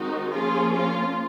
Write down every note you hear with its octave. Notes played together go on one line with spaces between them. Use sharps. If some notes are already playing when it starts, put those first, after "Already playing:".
Already playing: D#3 G#3 C4 D#4 F#4
F3 A#3 C#4 F4 G#4
F4